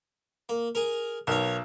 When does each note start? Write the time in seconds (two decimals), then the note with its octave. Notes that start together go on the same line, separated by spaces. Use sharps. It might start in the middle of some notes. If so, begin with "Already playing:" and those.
0.49 A#3
0.75 G#4 A#4
1.27 B1 A#4 C#5